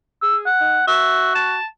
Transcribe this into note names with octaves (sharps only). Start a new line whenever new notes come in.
G#4 E6
F#5
D#4
F#4 E5
A5